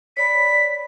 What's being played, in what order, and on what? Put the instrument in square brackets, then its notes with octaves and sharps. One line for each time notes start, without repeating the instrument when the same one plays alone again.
[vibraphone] C#5 D5 B5 [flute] B6